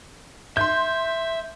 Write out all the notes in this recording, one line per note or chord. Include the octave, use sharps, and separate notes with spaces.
E5 C6 G6